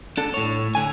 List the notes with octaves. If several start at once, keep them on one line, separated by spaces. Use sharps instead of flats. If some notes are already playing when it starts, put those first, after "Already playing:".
D4 A4
A2 C#5
D3 G#5